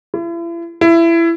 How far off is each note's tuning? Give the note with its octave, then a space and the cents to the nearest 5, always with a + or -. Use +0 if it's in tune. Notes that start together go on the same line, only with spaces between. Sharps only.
E4 +40
E4 +20